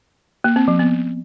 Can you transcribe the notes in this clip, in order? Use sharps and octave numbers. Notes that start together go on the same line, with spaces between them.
A#3
C4
F3
B3